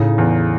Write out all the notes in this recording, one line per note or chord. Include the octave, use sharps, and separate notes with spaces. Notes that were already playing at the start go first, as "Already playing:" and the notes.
Already playing: A2 C#3 D#4
E2